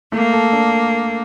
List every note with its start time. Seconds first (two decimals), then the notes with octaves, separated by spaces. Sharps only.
0.12 A3 A#3
0.33 A4
0.53 D4